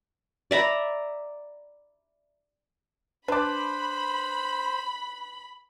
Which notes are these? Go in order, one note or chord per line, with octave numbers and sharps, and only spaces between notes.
D5 E5 A#5 B5
D4 B4 C5 A5 B5 D6